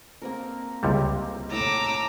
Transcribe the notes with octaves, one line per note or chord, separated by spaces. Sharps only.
A#3 C4 A#4
C#2 C3 G3
A2 A#5 D6 E6